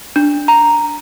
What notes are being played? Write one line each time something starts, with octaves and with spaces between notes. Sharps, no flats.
D4
A#5